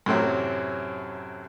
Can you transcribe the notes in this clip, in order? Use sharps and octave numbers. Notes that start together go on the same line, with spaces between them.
F#2 A2 C3 F#3